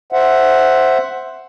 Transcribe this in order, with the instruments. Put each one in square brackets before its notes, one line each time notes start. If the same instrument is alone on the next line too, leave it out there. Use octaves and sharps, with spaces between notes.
[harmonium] C5 E5 F#5